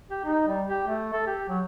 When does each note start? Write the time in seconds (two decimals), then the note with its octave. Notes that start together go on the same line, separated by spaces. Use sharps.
0.10 G4
0.24 D#4
0.48 G3
0.69 G4
0.87 A3
1.13 A4
1.27 G4
1.49 F#3